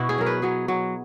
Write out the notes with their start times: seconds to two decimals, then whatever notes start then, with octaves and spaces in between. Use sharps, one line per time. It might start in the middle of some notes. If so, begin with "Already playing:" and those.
Already playing: B2 E4 F#4
0.09 G#4
0.18 F#3 A#4
0.26 B4
0.42 F#3 G#4
0.68 F#3